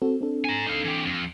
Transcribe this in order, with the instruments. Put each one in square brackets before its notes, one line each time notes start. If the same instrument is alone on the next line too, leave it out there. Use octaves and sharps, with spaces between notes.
[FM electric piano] C4 F#4 A4
C4 D4 A4
[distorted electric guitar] G#5 A#5
D#4 F5
E3 G4
F2